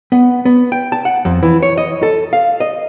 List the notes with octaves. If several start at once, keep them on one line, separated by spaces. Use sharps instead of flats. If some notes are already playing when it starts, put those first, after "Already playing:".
B3
B3
G5
A5
F#5
F2
E3
C#5
D#5
A4
F5
D#5